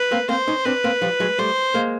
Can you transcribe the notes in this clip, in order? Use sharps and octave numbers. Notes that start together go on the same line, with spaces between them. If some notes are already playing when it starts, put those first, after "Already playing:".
Already playing: B4
A#3 C4
A#3 C4 C5
C#4 D#4
C4 D4 B4
A#3 C4
F3 G3
F#3 G#3
G3 A3 C5
G#3 A#3